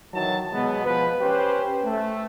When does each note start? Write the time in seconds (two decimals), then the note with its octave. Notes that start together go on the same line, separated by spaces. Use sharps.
0.12 D#3 E3 F#3 A5
0.52 B2 F#3 G#3 B3
0.85 F3 B3 B4
1.20 C#4 G4 B4 C5
1.84 A3